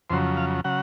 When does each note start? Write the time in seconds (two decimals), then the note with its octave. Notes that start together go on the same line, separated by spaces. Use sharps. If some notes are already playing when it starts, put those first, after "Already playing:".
0.10 F2 C#3 F#3 C5
0.37 F5
0.64 C#3 F#3 F#5